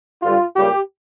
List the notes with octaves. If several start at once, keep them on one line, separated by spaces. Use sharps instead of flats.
G2 D3 G3 F4
C#2 C#3 G3 A#3 G4